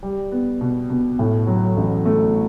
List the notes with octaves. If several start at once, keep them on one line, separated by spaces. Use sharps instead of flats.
G3
B3
B2
B2
A2
F#3
A1
A3